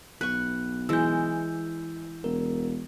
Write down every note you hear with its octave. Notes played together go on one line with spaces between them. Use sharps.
B1 B4 C#6 F#6
E3 G#3 E6 G6
E1 A#4